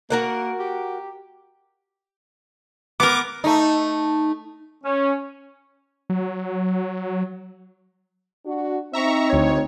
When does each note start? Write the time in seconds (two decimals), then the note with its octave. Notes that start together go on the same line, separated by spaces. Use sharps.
0.10 A#3 F#4 A#4 F#5
0.59 G4
3.00 B3 A#4 D6
3.44 A3 D#4
4.84 C#4
6.10 F#3
8.46 D4 F#4
8.93 C4 D#4 E5 A#5 C#6
9.30 D2 C#5